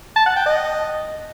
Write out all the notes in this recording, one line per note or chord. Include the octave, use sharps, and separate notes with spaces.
A5
F#5
G5
D#5